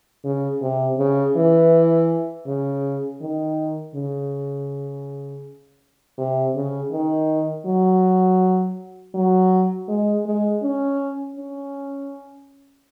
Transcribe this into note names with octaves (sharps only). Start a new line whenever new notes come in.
C#3
C3
C#3
E3
C#3
D#3
C#3
C3
C#3
D#3
F#3
F#3
G#3
G#3
C#4
C#4